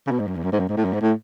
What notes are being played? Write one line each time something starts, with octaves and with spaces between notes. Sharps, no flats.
C#3
B2
G#2
F#2
E2
F#2
G#2
F#2
G#2
A2
F#2
G#2
A2